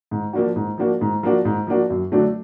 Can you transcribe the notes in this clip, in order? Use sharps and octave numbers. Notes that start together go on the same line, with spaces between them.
G#2
F3 A#3 D4 F#4
G#2
F3 A#3 D4 F#4
G#2
F3 A#3 D4 F#4
G#2
F3 A#3 D4 F#4
F#2
D3 F#3 A3 D4